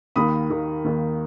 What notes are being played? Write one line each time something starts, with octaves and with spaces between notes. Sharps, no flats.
D#2 D#3 A#3 B5 D#6
D#2 D#3 A#3
D#2 D#3 A#3